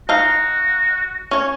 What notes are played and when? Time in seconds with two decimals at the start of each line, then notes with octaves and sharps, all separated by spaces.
0.09 D#4 F#4 F5
1.31 C#4 C#5